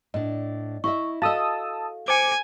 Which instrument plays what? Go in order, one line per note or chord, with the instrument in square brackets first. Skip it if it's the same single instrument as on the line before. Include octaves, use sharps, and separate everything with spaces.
[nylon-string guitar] A2 D4 [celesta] D#5
[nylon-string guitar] E4 D#5 E5 [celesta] C#6
[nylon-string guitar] F#4 A4 D#5 [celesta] F5 [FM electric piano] A5 D#6 E6
[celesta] C5 C#7 [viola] G#5 [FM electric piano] D6